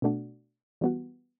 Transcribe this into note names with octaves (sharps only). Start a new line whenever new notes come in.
B2 A3 D4 F#4
E3 G3 B3 F#4